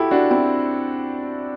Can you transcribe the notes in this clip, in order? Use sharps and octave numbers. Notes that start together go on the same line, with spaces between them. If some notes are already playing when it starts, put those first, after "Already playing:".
Already playing: E4 F#4 G4 A4
D4 F#4
C4 E4